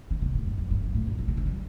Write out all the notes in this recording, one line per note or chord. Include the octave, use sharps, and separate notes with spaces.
D3
C3
A2
G2
F2
G2
G2
A2
G2
A2
C3
D3
G3